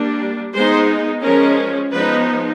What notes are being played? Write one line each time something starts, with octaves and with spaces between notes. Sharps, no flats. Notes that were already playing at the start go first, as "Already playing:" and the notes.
Already playing: G3 A#3 D4
G#3 B3 D#4 C5
F3 G#3 C#4 A#4
F3 G#3 B3 D#4 B4